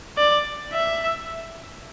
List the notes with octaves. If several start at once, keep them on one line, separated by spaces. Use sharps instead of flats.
D5
E5